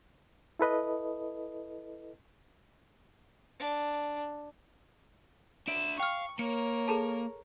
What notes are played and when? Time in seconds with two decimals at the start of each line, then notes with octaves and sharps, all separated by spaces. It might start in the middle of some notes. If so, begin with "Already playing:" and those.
0.60 E4 A4 B4 D#5
3.59 D4
5.68 D4 E5 D7 E7
6.00 F5 G5 C#6 F6
6.39 A#3 A#4 C#5 C#7
6.88 G#4 A4 A5